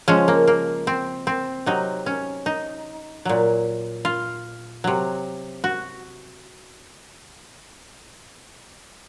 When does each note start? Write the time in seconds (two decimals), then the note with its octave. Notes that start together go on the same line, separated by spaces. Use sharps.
0.08 C#3 F3 G#3 C#4
0.28 A#3
0.47 A#3
0.87 C4
1.27 C4
1.66 C3 F#3 D#4
2.06 C#4
2.46 D#4
3.25 A#2 F#3
4.05 F4
4.84 C3 F#3
5.64 F#4